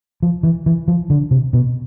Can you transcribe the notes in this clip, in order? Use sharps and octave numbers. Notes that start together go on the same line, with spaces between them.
F3
E3
E3
F3
D3
C3
B2